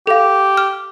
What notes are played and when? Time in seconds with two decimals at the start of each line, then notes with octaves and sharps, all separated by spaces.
0.07 G4 A4 F5
0.57 F6